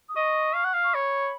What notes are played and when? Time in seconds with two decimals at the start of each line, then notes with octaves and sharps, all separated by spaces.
0.09 D#6
0.16 D#5 C#6
0.55 F5
0.64 F#5
0.74 F5
0.84 C#6
0.94 C#5 B5